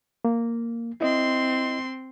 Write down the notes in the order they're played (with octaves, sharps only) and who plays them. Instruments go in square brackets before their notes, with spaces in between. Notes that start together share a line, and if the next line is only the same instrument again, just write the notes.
[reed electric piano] A#3
[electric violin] C4 C6 [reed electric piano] E4 D#5